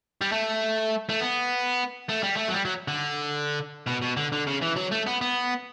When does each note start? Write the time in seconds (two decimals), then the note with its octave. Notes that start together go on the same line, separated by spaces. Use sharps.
0.21 G3
0.32 A3
1.10 A3
1.21 B3
2.09 A3
2.23 G3
2.37 A3
2.49 F#3
2.54 G3
2.65 F#3
2.88 D3
3.87 B2
4.02 B2
4.17 D3
4.32 D3
4.47 C#3
4.62 E3
4.76 F#3
4.91 A3
5.06 B3
5.21 B3